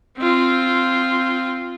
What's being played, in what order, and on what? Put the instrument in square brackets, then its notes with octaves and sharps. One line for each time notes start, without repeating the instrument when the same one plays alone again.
[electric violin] C4 F4